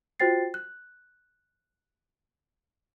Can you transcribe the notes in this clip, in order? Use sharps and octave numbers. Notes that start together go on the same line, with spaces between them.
F4 F#4 C5 G5 A6 C7
F#6